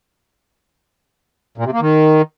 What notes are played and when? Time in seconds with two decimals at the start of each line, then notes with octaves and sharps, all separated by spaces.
1.58 A#2
1.65 C3
1.73 A#3
1.81 D#3